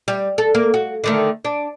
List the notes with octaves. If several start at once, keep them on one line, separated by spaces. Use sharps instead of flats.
G3
A4
A#3
F#4
D3 D#3 A3
D4